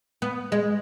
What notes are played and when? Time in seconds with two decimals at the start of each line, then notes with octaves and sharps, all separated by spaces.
0.22 B3
0.52 G#3